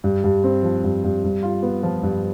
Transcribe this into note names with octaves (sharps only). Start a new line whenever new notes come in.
G2
G2
C4
F3
G2
G2
G2
F4
B3
F3
G2